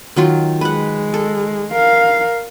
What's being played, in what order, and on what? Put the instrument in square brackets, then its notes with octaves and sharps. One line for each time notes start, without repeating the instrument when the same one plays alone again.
[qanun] D#3 F#3 F4
[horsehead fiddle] G#3 [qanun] B4 F#5
[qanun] A4
[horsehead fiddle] A#4 F5